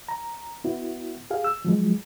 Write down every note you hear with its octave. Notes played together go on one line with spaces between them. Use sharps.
A#5
B3 E4 F#4
G4 G#4 F5
E6
F3 F#3 G#3